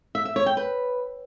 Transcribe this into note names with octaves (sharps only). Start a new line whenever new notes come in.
E5
E5
C#5
G5
B4